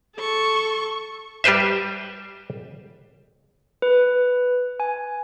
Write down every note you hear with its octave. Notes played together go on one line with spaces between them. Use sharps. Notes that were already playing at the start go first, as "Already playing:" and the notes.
A4 C#6
G3 G4 B4 C5 E5
B4
G#5